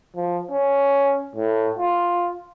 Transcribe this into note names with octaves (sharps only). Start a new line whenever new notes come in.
F3
C#4
A2
F4